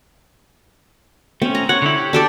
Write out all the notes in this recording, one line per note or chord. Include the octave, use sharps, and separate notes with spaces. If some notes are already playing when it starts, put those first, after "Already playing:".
A3 C4 C#4
A#5
C#5 F#5
D3 E4
G4
D4 A4 D5